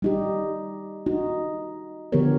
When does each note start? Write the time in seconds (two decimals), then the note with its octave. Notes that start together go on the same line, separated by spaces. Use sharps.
0.02 G3 D#4 G4
1.06 D#4 F#4
2.12 D3 F3 B3 G4 A#4 C#5